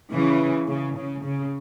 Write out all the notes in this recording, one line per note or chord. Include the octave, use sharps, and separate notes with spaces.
C#3 E3
C#3
C#3
C#3